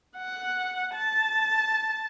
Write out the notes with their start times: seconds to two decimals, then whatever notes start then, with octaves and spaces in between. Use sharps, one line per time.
0.16 F#5
0.94 A5